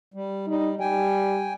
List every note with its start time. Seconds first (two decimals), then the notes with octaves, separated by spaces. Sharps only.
0.14 G3
0.47 G3 D#4
0.80 G3 G5 G#5